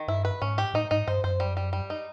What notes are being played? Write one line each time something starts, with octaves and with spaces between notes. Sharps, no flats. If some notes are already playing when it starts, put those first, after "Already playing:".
Already playing: D#3
G2 E4
B4
G#2 C#4
G4
A2 D#4
G#2 D#4
G2 C5
F#2 C5
G3
G3
G3
D#4